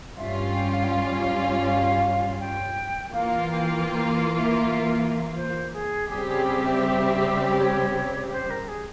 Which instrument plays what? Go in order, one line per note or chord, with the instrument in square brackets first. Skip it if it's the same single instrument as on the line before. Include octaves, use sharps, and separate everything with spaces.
[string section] G2 G3 C#4 F4 [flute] E5
[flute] G5
F5
G5
F5
F5
G5
[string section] E3 A#3 F4 [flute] F5
[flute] G5
G5
E5
C5
G#4
[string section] C#3 G3 C4 G4 [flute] G#4
[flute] G#4
G#4
E5
C#5
C5
A#4
G#4